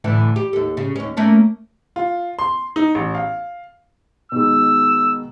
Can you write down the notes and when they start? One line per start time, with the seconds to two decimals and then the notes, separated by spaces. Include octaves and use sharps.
0.04 A2 D3 E3
0.36 G4
0.53 D#2 A4
0.77 C#3
0.96 D#2 C#4
1.17 A3 A#3 C#4
1.96 F4
2.39 C6
2.76 D#4
2.95 A1
3.15 F5
4.32 B2 D#3 G#3 E6